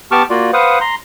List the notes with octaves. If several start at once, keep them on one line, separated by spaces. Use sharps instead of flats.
B3 G4 A5 C#6 D6 F6
A#3 F4 F#4 D5
B4 C5 F5 F#5 D#6
A#5 C6